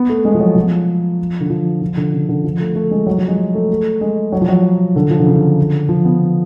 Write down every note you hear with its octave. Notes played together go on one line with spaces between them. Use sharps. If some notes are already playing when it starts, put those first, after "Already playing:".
Already playing: B3
A3
G#3
F3
F#3
F3
D3
F3
F3
D3
C#3
D3
F3
A3
A3
G#3
F#3
F3
G#3
A3
A3
G#3
F#3
F3
F#3
D3
F3
D3
C#3
D3
F3
B3